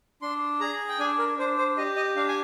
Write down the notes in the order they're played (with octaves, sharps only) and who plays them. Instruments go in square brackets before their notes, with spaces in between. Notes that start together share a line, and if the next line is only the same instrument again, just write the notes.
[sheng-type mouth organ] D4 C6
G#4 A#5
G5
D4 G#5
A#4
D4 C5
C5
G4 D#5
D#5
D4 F5
G#5